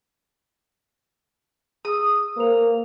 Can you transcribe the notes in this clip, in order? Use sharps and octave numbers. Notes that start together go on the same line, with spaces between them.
G#4 D#6 E6
A#3 B4 C5 F7